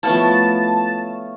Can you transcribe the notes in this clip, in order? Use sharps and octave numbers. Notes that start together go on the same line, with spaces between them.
F3 A3 B3 E4 C#5 F5 A5